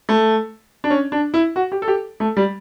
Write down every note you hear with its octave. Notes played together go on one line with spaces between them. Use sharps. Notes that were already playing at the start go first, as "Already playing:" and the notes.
A3
D4
C#4
D4
E4
F#4
G4
A4
G4
A3
G3